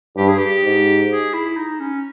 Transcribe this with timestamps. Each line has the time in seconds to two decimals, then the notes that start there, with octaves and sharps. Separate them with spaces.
0.17 G2 G4
0.28 G#4
0.38 G4
0.64 G#2
1.10 G#4
1.33 E4
1.57 D#4
1.80 C#4